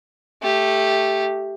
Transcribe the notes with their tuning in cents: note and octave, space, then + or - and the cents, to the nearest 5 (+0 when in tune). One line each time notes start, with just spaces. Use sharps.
A3 -5 G4 +0